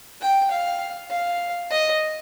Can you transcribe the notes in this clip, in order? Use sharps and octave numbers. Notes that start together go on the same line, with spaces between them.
G5
F5
F5
D#5